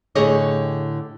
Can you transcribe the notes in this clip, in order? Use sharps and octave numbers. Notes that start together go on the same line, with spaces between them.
A2 D3 G4 G#4 C#5 D#5